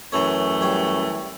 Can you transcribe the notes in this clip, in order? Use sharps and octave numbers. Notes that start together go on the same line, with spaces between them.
F#2 E3 A3 C#5 G#5 A#5
G3 C#5 G5